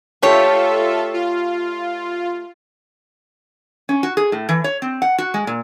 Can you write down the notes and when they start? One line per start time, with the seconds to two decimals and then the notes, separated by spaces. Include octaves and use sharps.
0.22 A3 F4 G4 A4 C#5 E5
1.14 F4
3.89 C#4
4.03 F#4
4.17 G#4
4.32 A2
4.49 E3
4.64 C#5
4.82 C4
5.02 F#5
5.18 F#4
5.34 G#3
5.47 A#2